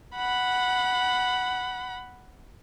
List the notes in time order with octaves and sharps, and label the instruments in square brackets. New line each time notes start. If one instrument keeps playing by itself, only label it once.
[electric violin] F#5 B5